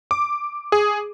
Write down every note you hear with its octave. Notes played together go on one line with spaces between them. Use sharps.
D6
G#4